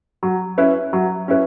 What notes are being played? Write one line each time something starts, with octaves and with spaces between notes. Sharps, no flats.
F#3
C#4 E4 B4
F#3
C#4 E4 B4